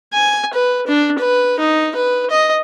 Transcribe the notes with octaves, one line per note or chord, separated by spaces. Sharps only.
G#5
B4
D4
B4
D#4
B4
D#5